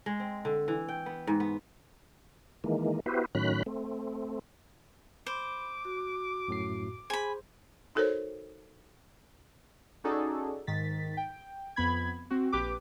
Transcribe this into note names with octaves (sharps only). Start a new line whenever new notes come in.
G#3
C4
D3
E3
G5
B3
G#2
B3
D#3 E3 G#3 A#3
B3 E4 F#4 G4 B4 C5
A2 D#3 F#3 C#4 B5 F#6
A3 C4
C5 B5 D6
F#4
F#2 A2 C7
G#4 C5 G#5 B5
D#4 F#4 A4 A#4 C5 C#5
C#4 D#4 F#4 G#4 A4 D5
G#2 D#3 A6 B6
G5
F2 B3 B5 G#6
C4 F#4
A#1 G4 B4 D6